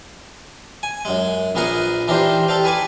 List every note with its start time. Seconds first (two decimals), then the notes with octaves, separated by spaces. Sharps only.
0.83 G#5
1.05 F#2 G#3
1.55 A#1 B3 G#4 A#4 F#5 D#6
2.08 E3 D4 D#4 G4 A#4 C5
2.48 G4 A4 D5 F5 G5
2.64 G#4 B4 G#5 D6